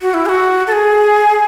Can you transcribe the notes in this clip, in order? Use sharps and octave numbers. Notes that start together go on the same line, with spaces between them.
F#4
E4
G#4
F#4
A4
G#4